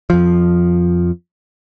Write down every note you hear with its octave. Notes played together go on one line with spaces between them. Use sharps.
F2 F3